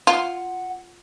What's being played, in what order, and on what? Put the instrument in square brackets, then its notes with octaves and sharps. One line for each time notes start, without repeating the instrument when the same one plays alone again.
[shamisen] F4 [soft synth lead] F#5